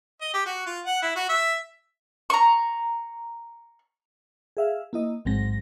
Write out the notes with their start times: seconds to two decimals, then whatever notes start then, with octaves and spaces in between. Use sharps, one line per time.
0.21 D#5
0.34 G4
0.46 F#4
0.66 F4
0.86 F#5
1.02 E4
1.16 F#4
1.29 E5
2.30 A#5 C#6
4.57 G#4 E5 F5
4.93 A#3 E4 D#5
5.25 A1 G#2 F#3 G#3 C4 A#6